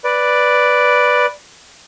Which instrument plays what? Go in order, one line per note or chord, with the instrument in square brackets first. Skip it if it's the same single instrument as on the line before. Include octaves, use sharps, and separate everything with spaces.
[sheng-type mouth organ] B4 D5